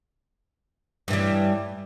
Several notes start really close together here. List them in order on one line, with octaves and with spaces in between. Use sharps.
G2 E3 G3